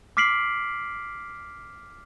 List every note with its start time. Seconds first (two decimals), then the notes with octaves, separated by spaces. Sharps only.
0.17 D6 F6 B6 C7 D7 F#7